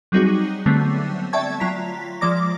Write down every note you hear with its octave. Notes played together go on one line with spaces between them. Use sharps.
F#3 G3 C4 D#4 F#4 G#4
D3 F#3 G3 A3 B3 C4
D5 E5 G5 A5 C#6 G#6
F#3 F4 A#5 B6
F3 G#3 D5 D6 A#6